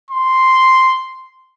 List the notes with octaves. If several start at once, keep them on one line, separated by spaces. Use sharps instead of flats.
C6